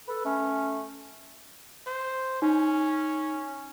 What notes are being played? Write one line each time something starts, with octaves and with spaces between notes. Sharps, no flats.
A4 B4
A3 C#4
C5
C#4 D#4